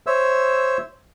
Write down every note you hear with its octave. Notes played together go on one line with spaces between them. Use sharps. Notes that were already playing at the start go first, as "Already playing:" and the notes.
C5 C#5 E5 E6